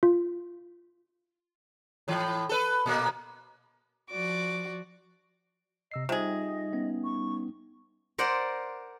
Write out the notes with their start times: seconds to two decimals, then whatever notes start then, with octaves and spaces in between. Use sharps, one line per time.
0.03 F4
2.08 A2 E3
2.49 A4 B4
2.86 A#2 A#3
4.11 F3 F#4 D5 D6
5.92 C3 D#5 E6 C7
6.09 C3 G3 D#4 F4 G#4 D#5
6.73 B3 C#4
7.04 C#6
8.18 A#4 C5 D5 F#5